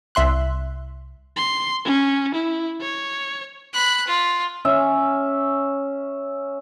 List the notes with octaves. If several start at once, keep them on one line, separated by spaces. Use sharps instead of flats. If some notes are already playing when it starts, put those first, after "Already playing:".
C2 E5 C6 F#6
C6
C#4
E4
C#5
B5 F#6
F4
C#4 E5